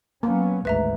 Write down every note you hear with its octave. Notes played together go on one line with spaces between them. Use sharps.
F#3 A#3 B3 C#4
G#1 D2 G#2 B4 E5 A#5